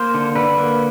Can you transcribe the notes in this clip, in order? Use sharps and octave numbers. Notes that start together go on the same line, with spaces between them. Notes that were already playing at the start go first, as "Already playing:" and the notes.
Already playing: A#3 C5
D3
D3 B4
A#3